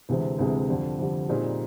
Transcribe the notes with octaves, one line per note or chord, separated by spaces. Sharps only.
D2 C3 E3 G#3 C4
D2 C3 E3 G#3 C4
F2 D3 G3
F2 D3 G3
A#2 G3 C4 D#4 G#4